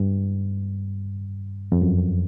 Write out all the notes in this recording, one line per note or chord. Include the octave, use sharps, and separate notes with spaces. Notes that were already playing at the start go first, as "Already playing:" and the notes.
Already playing: G2
F2
F#2